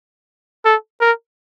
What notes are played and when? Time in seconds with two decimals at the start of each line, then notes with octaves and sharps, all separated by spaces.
0.65 A4
1.01 A#4